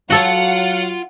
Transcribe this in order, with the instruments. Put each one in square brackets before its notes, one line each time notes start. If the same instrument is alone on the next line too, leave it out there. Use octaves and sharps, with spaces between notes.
[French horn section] F#3 [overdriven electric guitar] F4 F5 [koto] F#4 A4 C#5 [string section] F#5